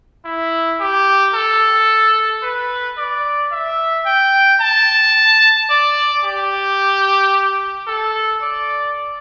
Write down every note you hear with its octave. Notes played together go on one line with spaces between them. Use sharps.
E4
G4
A4
B4
D5
E5
G5
A5
D5
G4
A4
D5